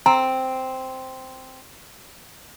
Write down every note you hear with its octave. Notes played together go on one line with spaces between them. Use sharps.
C4 A#5